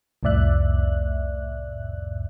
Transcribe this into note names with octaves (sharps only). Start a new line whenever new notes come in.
C2 F2 A2 D5 E5 F#6